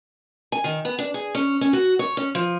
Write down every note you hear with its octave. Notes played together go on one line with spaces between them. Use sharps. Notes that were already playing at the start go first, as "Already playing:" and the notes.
G#5
D#3
B3
D4
G#4
C#4
C#4
F#4
C#5
C#4
F3